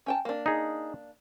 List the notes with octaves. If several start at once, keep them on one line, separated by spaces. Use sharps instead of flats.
C#4 G5 A5
A#3 D4
D#4 G#4